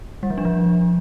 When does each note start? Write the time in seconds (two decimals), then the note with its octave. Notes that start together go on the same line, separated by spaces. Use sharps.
0.23 G3
0.30 F3
0.38 D4
0.45 F3